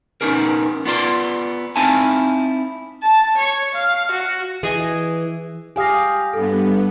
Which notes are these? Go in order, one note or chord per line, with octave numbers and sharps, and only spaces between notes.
B3 C#4 D#4 G#4 A#4
B3 F4 D5 C6
C4 D#4 E4 F5 G#5 A5
A5
C#5
F5
F#4
E3 G#4 D#5 G#5
G4 G#4 F5 G#5 D#6 A#6
G2 B3 A4